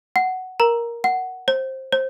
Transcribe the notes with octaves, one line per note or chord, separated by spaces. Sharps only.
F#5
A#4 A#5
F#5
C5
C5